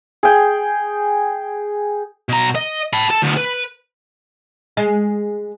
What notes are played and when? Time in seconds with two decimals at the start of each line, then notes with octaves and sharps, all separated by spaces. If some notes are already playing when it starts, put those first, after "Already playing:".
0.23 G#4 G5
2.29 B2 A#5
2.56 D#5
2.93 A5 B5
3.10 A4
3.22 D2 B3
3.37 B4
4.77 G#3